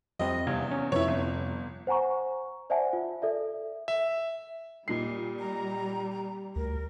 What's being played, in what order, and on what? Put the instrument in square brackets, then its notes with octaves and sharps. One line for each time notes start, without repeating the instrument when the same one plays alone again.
[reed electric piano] F2 G3 C4 [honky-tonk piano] D#5
[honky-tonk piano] E2 [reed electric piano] C3 F5 G#6
[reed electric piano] C#4
[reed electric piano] F2 C3 [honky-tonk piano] E4 C#5
[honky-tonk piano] G1
[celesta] C5 F#5 G#5 A#5 C#6
C5 D5 E5 F#5 G#5 A5
F4
A4 D5 E5
[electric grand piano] E5
[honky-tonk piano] A#2 D#4 C7 [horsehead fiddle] G3
[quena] A#5
[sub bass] D2 [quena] A#4